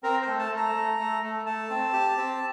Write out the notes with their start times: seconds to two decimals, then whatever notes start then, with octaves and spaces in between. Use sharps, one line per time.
0.03 C4 A#4
0.22 C5
0.27 A3
0.39 A5
0.51 A3
0.57 A#5
0.74 A3
0.99 A3
1.22 A3
1.45 A3 A5
1.70 C4
1.93 G4
2.17 C4